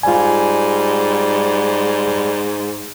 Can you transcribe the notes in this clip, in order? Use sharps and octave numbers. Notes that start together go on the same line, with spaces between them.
G#2 G3 F4 G#5